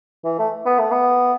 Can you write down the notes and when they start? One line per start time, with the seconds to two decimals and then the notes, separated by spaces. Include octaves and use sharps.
0.24 E3
0.39 A3
0.66 B3
0.79 A3
0.91 B3